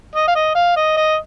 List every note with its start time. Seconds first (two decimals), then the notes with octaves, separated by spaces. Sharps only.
0.15 D#5
0.28 F5
0.35 D#5
0.55 F5
0.76 D#5
0.97 D#5